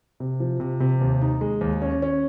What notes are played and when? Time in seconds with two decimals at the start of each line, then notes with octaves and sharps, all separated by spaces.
0.20 C3
0.40 F3
0.60 C3
0.80 C3
1.01 D#2
1.21 D#4
1.41 G#3
1.61 D#2
1.82 C#4
2.02 C#4